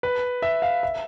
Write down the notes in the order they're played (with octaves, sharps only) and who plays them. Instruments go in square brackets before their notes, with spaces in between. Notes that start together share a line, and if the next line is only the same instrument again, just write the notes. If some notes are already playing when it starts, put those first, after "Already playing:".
[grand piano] B4
E5
F5
E5